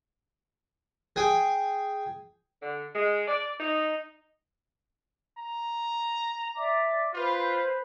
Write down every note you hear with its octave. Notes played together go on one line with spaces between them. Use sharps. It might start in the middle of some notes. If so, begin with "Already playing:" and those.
G#4 G5 G#5
D3
G#3
D5
D#4
A#5
D5 E5 D6
F4 B4 C5